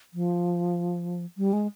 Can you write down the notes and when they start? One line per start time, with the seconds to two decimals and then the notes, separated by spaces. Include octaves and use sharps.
0.14 F3
1.38 G3
1.53 G#3